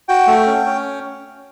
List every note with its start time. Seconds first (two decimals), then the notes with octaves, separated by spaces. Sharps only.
0.09 F#4 G5
0.27 A3
0.47 C#4
0.66 C#4